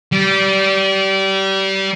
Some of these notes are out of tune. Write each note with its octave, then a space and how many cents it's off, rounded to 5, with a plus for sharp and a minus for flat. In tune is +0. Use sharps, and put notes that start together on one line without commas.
G3 -25